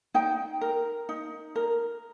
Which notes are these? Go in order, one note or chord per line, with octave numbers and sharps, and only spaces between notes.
D#4 G5
A#4
D#4
A#4